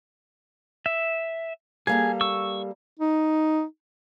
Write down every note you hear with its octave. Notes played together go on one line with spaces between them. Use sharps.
E5
G3 A#3 G#4 A4
C#6 E6
D#4